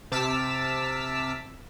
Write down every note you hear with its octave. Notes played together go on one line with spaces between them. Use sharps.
C3 A5 D6 E6 F6 B6